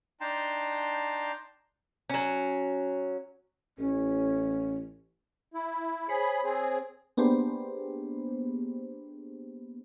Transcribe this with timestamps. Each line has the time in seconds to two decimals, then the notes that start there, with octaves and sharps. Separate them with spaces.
0.21 D4 D#4 G5 A5 A#5 C6
2.10 F#3 C#4
3.78 A1 C#4
5.54 E4
6.09 G#4 C5 C#5 B5
6.43 C4 G#4
7.17 A#3 B3 D4 G4 G#4 C5